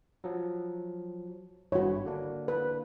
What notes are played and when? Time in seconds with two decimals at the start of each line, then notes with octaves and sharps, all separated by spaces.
0.24 F3 F#3
1.72 G#1 G2 E4 F#4 C#5
2.05 D3 A#3 D4
2.48 B4